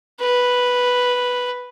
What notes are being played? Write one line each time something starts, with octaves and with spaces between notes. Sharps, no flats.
B4